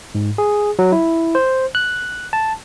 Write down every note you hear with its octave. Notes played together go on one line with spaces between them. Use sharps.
G#2
G#4
F#3
E4
C5
F#6
A5